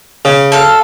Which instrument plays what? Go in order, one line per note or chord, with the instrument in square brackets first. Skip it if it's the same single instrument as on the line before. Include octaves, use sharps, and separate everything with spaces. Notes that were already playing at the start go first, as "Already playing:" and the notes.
[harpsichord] C#3
[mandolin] A4 F5